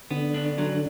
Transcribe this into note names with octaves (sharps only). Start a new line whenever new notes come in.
D3 B3
D4
F#3